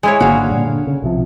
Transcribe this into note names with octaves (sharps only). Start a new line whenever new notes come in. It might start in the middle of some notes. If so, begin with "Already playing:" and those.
G#3 E4 C#5
G#1 D3 A#3 F#4 F5
G2 A#2
D3
C#3
B1 C3 F3